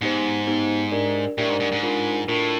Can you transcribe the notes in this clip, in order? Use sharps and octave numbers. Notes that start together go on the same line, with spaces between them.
G#2 B3 D#4 G4 C5
B3 D#4 G4 C5
D4 G4 A#4 D5
A2 D4 G4 A#4 D5
G#2
G#2
G#2
D4 F4 A#4
A2 D4 F4 A#4